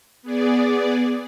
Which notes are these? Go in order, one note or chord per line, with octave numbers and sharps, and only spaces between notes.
B3 G#4 D5